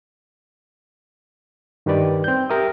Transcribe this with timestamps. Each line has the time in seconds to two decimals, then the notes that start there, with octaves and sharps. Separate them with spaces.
1.86 G2 D#3 G4 B4 D5
2.24 C4 G6
2.50 G4 A#4 E5 D#6